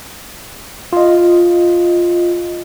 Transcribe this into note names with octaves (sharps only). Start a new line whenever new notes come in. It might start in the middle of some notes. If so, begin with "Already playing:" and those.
F4 D#5